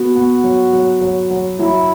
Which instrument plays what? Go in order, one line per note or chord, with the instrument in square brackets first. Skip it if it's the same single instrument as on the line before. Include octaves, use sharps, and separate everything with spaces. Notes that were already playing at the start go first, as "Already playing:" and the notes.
Already playing: [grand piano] B3 [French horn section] F#4
[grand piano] B3
F#3
F#3
F#3
F#3
[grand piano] F#3 [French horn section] E4